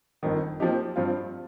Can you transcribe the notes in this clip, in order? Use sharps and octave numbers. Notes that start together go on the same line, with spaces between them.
G1 F2 D#3
A#2 F3 C4 D#4 G4
G2 F3 C4 F4